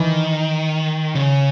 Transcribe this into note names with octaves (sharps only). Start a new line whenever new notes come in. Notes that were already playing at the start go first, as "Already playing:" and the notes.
Already playing: D#3 E3
C#3